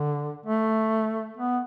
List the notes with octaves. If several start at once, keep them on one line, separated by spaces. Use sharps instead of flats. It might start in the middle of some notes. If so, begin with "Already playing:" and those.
Already playing: D3
A3
B3